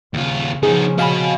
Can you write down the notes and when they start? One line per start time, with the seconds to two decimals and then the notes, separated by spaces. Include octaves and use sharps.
0.14 D#2 C#3 F4
0.63 C#3 F3 B3 D#4 G#4
0.99 F#4 D#5 F5 G#5 B5